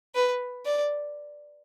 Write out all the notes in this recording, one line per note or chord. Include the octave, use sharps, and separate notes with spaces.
B4
D5